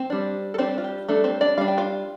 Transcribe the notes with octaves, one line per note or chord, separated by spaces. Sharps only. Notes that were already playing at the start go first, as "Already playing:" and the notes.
Already playing: C4 C5
G3 D4
A4
G3 C4 D4 C5
F4
G4
G3 A3 D4 A4
C4 C5
D4 D5
G3 D4 F5
G5
F4 F5